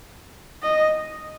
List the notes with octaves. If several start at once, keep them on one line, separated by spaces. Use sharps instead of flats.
D#5